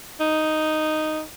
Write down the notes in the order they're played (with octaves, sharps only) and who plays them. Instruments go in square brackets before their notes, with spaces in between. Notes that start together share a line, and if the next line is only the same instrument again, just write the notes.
[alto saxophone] D#4